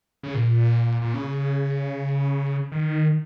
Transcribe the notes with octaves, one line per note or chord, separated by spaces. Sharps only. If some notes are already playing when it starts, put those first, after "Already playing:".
C#3
A#2
A#2
C#3
D#3